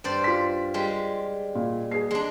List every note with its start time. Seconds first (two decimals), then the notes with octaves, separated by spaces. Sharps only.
0.04 G2 C5 D5
0.24 F4 B6
0.74 G3 G#3
1.55 A#2
1.91 G#4 C7
2.11 G#3 D4